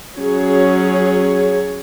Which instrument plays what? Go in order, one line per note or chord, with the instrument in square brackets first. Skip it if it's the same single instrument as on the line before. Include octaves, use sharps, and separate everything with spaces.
[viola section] F#3 C#4 G#4 C#5